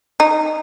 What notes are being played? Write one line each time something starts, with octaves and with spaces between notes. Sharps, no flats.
D#4